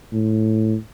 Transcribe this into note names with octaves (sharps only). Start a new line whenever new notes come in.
A2